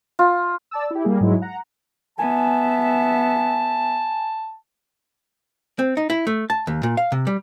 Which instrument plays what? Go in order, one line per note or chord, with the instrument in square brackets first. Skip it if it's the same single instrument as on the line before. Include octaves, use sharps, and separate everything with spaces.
[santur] F4
[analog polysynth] D5 A5 E6
E4 G4
G3 A#3 G#4
G#2 F#3 G#3 E4
F#5 A#5
[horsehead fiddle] B3 E5 [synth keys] G#5 [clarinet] A5
[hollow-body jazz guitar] C4
D#4
E4
A3
A5
D#2
A#2
F5
C3
G3